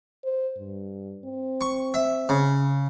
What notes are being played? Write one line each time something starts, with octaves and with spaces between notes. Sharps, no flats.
C5
G2
C4
C#6
E5
C#3